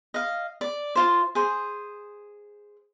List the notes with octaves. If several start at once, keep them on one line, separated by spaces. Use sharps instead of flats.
D#5 F5
D5
F4 C5
G#4 C5